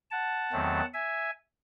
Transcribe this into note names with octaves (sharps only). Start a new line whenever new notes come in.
F#5 A5
E2 D#3 F#3 A3 C4
E5 G#5